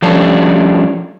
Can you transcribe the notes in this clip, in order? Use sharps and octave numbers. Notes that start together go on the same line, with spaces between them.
F3 G3 C#4 D4 A4